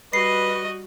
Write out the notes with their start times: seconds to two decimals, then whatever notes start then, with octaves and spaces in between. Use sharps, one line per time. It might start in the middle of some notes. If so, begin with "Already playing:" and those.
0.13 G3 F#4 B4 D#5 C7